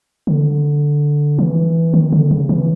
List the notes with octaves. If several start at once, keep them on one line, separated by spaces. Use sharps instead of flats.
D3
E3
D#3
D3
C#3
E3